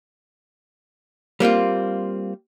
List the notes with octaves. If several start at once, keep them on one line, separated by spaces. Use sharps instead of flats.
G3 A#3 C4 F4